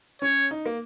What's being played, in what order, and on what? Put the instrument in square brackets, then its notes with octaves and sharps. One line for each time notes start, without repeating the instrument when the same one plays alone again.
[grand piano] C#4 [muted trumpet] C#5
[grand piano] D#4
A#3